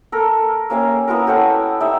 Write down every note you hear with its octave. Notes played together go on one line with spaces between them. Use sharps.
A4 A#4
A#3 C#4 G4 F5
B3 E4 F#4 A#4
G4 A4 C#5 F#5
D#4 G4 D5 E5